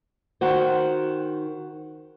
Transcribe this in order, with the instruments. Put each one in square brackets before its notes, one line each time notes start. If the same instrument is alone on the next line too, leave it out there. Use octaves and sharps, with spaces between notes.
[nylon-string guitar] D#3 F#4 C5